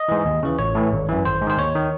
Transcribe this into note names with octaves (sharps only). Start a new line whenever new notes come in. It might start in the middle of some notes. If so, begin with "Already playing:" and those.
Already playing: D#5
G#2 E3
D#2
C#3 E3
A1 C#5
A2 E3
G#1
F#2 E3
G#1 C5
G#2
D#3 C5
D#2 C#5
D#3